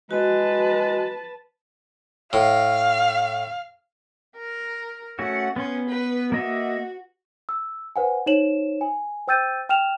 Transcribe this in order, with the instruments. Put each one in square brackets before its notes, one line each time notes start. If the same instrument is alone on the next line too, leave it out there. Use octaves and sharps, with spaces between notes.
[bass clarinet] G#3 [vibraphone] F#4 [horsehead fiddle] B4 A5
[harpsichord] A2 [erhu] F5
[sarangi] A#4
[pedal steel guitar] A3 C#4 F#4 [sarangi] F#5
[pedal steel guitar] B3 C6 [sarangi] C#4
[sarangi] B4
[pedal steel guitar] A#3 D#5 E5 [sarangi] F#4
[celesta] E6
B4 C5 F#5 G#5
D#4 C5 C#5 E7 F#7
G#5
C5 G5 E6 G6 A6 D#7
G5 F6 E7 F7